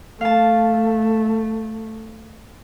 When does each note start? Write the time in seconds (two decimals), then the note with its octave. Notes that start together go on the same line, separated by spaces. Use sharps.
0.21 A3 F5 A5